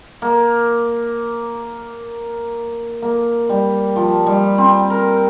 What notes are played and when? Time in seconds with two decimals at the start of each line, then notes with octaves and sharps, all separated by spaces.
0.22 A#3
3.02 A#3
3.49 G3
3.96 F3
4.27 G3
4.58 C4
4.90 A#4